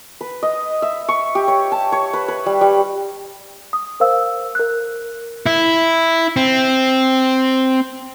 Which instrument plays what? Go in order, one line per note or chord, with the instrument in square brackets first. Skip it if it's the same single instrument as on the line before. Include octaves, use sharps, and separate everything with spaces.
[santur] B4
D#5
E5
C#6
G4
C#5
A5
C#5
B4
B4
G3
G3
[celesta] D#6
A#4 C5 F5 E6
A#4 F#6
[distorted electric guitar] E4
C4